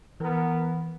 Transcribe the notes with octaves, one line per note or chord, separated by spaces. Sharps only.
E3 B3 A#4